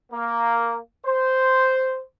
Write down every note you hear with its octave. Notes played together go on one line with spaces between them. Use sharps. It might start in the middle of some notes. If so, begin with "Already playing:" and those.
A#3
C5